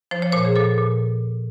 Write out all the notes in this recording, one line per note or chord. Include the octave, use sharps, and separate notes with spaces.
F3 C5
C#5
A#2 C5
G#4
A#2 A4
A#2